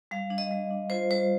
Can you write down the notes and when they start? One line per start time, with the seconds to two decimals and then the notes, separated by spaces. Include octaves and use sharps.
0.11 G3 F5
0.30 D4
0.38 D#5
0.51 G3
0.70 D4
0.90 F4 C5
1.11 G3 C5